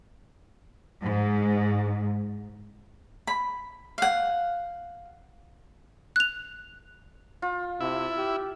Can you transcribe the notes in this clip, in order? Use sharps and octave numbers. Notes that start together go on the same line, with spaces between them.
G#2
B5
F5 F#5
F#6 F7
F4
C3 E4
G4